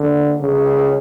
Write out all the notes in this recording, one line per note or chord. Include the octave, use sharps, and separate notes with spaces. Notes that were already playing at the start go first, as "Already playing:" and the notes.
Already playing: D3
C#3